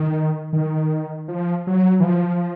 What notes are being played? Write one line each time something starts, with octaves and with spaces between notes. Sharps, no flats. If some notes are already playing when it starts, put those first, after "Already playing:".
Already playing: D#3
D#3
F3
F#3
E3
F3